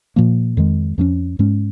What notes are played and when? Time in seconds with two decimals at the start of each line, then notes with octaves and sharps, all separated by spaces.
0.16 A#2 F3 A#3
0.57 F2 D#3 G#3
0.98 F2 F3 A#3 C#4
1.39 G#2 G#3 C#4